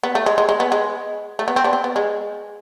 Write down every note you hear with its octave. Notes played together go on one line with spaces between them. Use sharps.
B3
A3
G#3
G#3
G#3
B3
G#3
A3
B3
C4
B3 D4
C4
B3
G#3